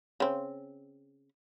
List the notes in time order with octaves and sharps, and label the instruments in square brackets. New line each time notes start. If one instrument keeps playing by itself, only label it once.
[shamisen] C#3 C4